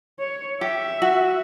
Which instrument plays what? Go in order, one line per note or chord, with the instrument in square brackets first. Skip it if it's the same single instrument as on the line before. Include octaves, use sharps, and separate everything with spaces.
[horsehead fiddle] C#5
[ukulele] G4 [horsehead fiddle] E5
[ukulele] F#4